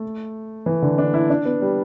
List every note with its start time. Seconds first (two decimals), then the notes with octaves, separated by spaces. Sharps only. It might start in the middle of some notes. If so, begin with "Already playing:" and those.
Already playing: A3
0.66 E3
0.82 D3
0.98 D4
1.14 E4
1.30 D4
1.46 B3
1.62 G3